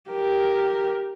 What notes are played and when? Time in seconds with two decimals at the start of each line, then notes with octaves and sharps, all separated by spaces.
0.10 G4 A#4